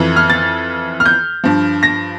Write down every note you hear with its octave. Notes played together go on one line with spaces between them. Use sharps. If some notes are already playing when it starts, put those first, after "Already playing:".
Already playing: F2 E3
F6
A6
F6
G6
G2 F3
A#6